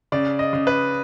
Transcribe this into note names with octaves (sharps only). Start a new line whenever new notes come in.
C#3 D5
D#5
C#3
B4